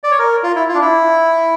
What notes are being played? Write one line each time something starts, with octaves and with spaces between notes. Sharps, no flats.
D5
C#5
A#4
F4
E4
F4
D4
E4